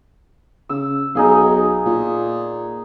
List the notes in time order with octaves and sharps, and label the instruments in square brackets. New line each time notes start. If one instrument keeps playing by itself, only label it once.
[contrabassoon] C#3 [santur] E6
[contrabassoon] B1 [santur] D#4 G#4 F5
[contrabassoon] A#2